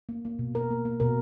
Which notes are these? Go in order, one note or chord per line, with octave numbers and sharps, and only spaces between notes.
A#3
A#3
B2
B2 A#4
A#3
A#3
B2 A#4